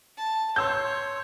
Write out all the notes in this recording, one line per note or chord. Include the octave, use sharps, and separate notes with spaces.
A5
C#5 C6 E6 G6